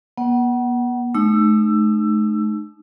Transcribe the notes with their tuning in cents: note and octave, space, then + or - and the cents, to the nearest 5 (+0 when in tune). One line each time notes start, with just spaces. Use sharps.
B3 -40 F#5 +25
A3 -40 D#4 -25 E6 +15